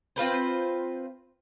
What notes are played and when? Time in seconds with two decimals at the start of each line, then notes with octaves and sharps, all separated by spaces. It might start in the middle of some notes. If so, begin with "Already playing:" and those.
0.16 C4 F4 B4 C5